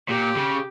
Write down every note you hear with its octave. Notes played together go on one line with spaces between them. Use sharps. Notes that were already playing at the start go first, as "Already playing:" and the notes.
A#2 G4
C#3